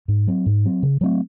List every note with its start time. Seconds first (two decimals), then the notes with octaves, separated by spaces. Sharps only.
0.08 G#2
0.27 F#3 C4
0.46 G#2
0.65 F#3 C4
0.83 C#3
1.01 F#3 A3 C4